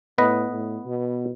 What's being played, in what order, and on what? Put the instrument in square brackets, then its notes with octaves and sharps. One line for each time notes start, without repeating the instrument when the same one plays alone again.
[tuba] A2 [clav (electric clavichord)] B3 B4 D#5
[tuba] A2
B2